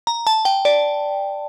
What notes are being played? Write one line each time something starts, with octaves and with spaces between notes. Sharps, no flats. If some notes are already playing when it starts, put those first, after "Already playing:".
A#5
A5
G5
D5